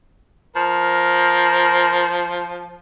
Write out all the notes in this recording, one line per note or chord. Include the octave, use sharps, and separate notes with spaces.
F3 A#4